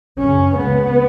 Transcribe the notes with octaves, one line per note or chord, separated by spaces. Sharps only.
F#2 C#3 C#4
C#2 C#3 B3